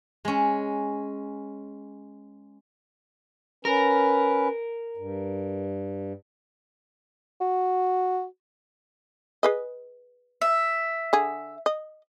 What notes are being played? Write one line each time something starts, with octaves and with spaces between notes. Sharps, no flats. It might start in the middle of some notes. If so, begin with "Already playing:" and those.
G#3 C#4
C#4 A#4 B4
G2
F#4
G#4 B4 D#5
E5
D3 G#4
D#5